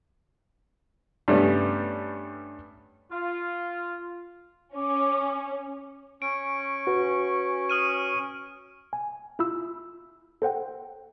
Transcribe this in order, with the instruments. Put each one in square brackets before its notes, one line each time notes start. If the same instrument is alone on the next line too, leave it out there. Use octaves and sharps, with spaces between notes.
[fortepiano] G2 G3 A3 B3 C#4
[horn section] F4
[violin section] C#4 [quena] D6
[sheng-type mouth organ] C#4 C#6 [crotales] D7
[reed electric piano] F#4 B4
[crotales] D#6 F6 D#7
[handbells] G#5
E4 F4 B5 E6
A4 C5 F#5 G5